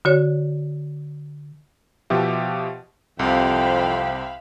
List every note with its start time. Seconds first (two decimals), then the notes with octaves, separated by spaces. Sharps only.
0.05 D3 F#4 C#5
2.10 B2 F3 G4 E5
3.19 C2 F2 C3 C5 E5 F5 G5 B5